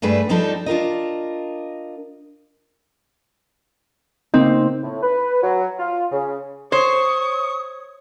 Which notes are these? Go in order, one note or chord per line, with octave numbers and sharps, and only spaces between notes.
G2 G3 A3 G#4 B4
F3 G3 C4 D4 D#4 A4
D4 F4 A#4 D#5
C#3 A#3 C4 D#4
A2
B4
F#3
F4
C#3
C5 C#5 C#6 D#6